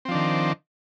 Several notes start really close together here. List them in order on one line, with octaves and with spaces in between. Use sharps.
C4 F3 D4 D#3